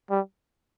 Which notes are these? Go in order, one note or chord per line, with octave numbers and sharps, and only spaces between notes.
G3